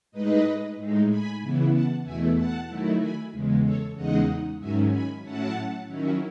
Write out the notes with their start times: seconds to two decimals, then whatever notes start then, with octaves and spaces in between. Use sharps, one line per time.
0.12 A2 G#3 D#4 B4 D#5
0.76 A2 G#3 D#4
1.07 G#5 B5
1.40 C#3 E3 B3 E4
1.72 F#5 A5
2.04 E2 B2 A3 E4 E5 G#5
2.35 F#5 A5
2.68 D#3 F#3 A3 E4
3.00 G#5 B5
3.32 E2 C#3 G#3
3.63 A4 C#5
3.95 E2 C#3 G#3 D#4 D#5 F#5
4.59 G#2 D#3 F#3 C#4 E5 G#5
4.91 G#5 B5
5.23 A2 F#3 C#4 E4 F#5 A5
5.87 D#3 F#3 C#4 E4